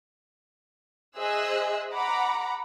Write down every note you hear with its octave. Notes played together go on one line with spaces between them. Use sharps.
G#4 C5 D#5 E5 E6 F#6
F#5 A#5 B5 D6